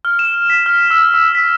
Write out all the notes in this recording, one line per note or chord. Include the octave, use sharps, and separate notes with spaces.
F6
E7
B6
F6
E6
E6
B6